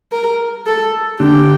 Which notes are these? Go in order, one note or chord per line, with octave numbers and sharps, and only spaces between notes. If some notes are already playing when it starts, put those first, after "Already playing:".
A#4
A4
D3 G4